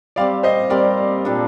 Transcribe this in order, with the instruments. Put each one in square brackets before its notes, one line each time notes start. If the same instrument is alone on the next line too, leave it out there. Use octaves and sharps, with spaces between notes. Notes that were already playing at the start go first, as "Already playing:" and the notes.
[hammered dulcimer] G3 C4 G4 [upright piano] D5 F5
[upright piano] C5 D#5
[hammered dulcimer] G3 C4 G4 [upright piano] A#4 D5
[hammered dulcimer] A#2 G3 D4 A4